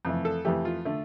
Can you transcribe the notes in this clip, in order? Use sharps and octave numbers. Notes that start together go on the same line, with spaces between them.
F2 E3 A3
A4
F2 E3 A3 G4
F4
D3 A3